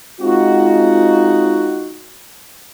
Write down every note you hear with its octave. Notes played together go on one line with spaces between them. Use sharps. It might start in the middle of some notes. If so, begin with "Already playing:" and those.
G#3 C4 D#4 F4 F#4